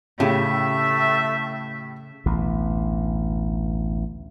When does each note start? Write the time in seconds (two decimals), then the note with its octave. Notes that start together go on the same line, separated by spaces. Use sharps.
0.20 A2 C#3 A3 G4 E5
2.26 A1 D2 B2